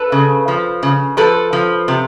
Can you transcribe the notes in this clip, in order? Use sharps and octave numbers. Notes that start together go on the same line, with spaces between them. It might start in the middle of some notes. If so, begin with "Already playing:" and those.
Already playing: A4 B4
C#3
F3
C#3
F3 A4 B4
F3
C3